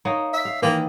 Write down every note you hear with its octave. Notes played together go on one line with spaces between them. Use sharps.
A#3 D#4 C#5
E5
F5
D#3 E3 A#3